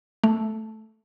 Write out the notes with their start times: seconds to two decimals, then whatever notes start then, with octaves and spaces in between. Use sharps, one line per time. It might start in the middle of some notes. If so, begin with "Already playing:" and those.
0.24 A3